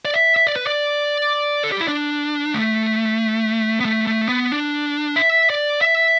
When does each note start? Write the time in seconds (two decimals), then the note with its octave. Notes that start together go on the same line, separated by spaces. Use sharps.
0.05 D5
0.14 E5
0.36 E5
0.47 D5
0.56 B4
0.67 D5
1.64 A4
1.72 G4
1.81 E4
1.88 D4
2.54 A3
3.80 B3
3.85 A3
4.07 A3
4.28 B3
4.52 D4
5.16 E5
5.50 D5
5.81 E5